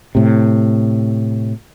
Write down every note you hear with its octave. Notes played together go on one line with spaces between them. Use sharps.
A2 C3